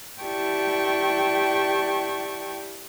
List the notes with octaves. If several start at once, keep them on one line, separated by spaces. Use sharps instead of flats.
E4 G4 D5 G5 A5 C#6